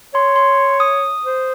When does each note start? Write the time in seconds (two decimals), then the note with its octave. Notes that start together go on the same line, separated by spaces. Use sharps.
0.14 C#5 C6
0.36 C6
0.80 D#6
1.25 C5